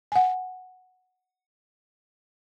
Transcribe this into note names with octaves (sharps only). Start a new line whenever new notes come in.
F#5 G#5